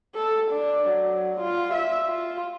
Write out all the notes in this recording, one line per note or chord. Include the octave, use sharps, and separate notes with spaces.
A4
D4
F#3
F4
E5
F4